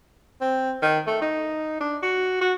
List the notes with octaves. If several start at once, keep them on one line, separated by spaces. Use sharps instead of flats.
C4
D#3
A3
D#4
D4
F#4
F#4